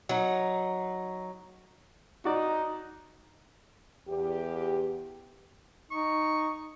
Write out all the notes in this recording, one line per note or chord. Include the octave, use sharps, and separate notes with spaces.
F#3 D#4
D#4 F#4 D5
E2 G4
D#4 C#6